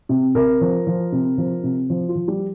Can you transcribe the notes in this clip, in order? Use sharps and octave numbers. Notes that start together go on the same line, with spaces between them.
C3
C3 A#4
F3
F3
C3
F3
C3
F3
F4
F3
G3